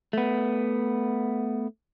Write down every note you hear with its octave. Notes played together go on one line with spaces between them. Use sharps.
A3 B3